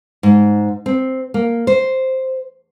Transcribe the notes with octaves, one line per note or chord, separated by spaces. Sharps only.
G#2
C4
A#3
C5